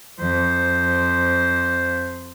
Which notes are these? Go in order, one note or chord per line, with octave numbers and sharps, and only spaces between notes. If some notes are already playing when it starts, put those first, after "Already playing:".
F2 C5